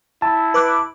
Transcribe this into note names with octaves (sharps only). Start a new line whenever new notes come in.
E4 A5
B4 D6 F#6